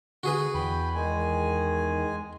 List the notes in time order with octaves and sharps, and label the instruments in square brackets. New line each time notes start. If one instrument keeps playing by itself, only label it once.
[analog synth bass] D3 [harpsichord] F#4 G#4 B4
[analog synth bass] E2 [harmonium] G5 [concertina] B5
[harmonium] D#3 [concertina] G#3 G#5